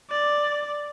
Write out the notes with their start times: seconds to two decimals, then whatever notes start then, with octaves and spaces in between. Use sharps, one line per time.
0.11 D5